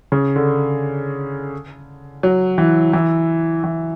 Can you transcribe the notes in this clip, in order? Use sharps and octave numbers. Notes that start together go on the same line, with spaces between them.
C#3
D3
F#3
E3
E3
E3